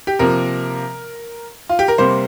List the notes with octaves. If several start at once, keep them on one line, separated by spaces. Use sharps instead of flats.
G4
C3 F3 A#3 A#4
F4
G4
A#4
C3 G3 A#3 C5